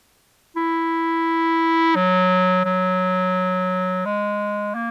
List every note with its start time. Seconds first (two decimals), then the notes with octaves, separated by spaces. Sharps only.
0.56 E4
1.95 F#3
2.65 F#3
4.05 G#3
4.75 A#3